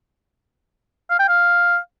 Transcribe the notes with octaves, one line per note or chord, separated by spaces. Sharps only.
F5
G5
F5